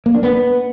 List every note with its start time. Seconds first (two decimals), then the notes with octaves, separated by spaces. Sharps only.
0.06 A#3
0.14 D4
0.23 B3